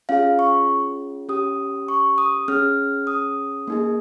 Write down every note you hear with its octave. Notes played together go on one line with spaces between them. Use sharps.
C#4 F4 G#4 F5
C#6
C#4 G4 D#6
C#6
D#6
C#4 G#4 F6
D#6
A#3 D#4 G#4